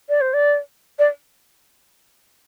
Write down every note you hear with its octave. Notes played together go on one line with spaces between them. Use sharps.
D5
C5
D5
D5